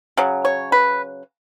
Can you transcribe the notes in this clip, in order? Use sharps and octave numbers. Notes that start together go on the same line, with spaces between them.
C#3 F#3
C#5
B4